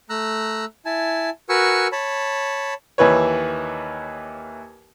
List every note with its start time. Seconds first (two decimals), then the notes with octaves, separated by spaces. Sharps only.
0.10 A3 A#5 E6 F#6
0.85 E4 G#5 A5
1.49 F#4 A#4 B4 G#5 C#6 E6
1.92 C#5 A5 B5
2.98 D#2 E3 B4 C#5